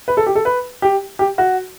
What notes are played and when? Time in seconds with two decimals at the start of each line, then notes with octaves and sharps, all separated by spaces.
0.08 B4
0.17 A4
0.27 G4
0.35 A4
0.45 B4
0.82 G4
1.19 G4
1.38 F#4